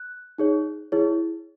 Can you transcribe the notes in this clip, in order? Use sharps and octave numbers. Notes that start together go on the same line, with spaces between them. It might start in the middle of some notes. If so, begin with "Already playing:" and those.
Already playing: F#6
D#4 G#4 C#5
E4 G#4 C#5